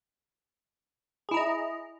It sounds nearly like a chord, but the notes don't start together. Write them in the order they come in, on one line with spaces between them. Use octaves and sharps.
G#4 E4 A#5 D#5